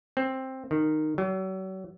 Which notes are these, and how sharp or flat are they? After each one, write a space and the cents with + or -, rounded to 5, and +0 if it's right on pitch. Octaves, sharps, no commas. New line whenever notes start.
C4 +10
D#3 -15
F#3 +40